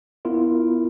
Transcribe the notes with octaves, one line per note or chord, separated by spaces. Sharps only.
B3 E4 F4 A#4